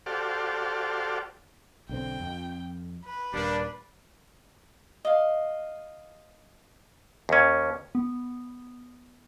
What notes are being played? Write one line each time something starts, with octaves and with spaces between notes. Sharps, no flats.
F#4 G4 A4 C5 D5 F5
B1 D3 C4 G5
F2
B4
D#1 G2 G3 A#3 D4
D#5 F5
D#2 C#4
B3